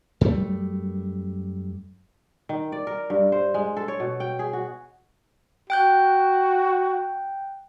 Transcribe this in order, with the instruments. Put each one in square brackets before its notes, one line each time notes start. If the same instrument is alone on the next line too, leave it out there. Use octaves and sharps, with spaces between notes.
[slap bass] F#2 G3 A3
[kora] D#3
D5
A#4
G2
C5
G#3
A4
C#5
B2
G5
G#4
F#4
[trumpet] F#4 [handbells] G5 F#6 G6